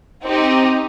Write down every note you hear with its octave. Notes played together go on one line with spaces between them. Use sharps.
C4 D#4 G4